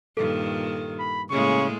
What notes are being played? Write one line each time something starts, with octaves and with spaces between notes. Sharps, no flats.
G2 A#2 D#3 A4
B5
A2 C#3 G#3 A#3 C#6